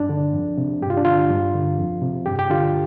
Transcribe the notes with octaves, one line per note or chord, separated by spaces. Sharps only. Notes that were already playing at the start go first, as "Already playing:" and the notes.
Already playing: G2 D4
D3
F2
C3
G2 G4
F4
D4
D3 F4
G2
D3
F2
C3
G2 G4
G4
D3 F4